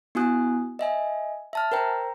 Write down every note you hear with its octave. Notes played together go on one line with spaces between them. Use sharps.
B3 E4 F#4 G#5 D#6 F#6
D#5 E5 G#5
E5 A5 F6
A#4 C5 G5 A#5